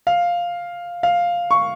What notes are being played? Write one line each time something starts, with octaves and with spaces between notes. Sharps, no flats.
F5
F5
C#6